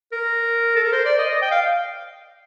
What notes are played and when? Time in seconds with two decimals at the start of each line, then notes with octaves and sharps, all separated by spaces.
0.12 A#4
0.76 A4
0.84 A#4
0.92 C5
1.05 D5
1.19 D#5
1.31 D#5
1.42 G5
1.51 F5